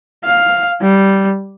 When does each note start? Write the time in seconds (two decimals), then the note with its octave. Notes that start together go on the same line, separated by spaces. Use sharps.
0.25 F5
0.82 G3